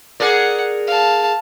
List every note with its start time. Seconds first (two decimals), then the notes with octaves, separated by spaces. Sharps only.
0.20 G#4 A#4 D5 F#5
0.87 F5 A5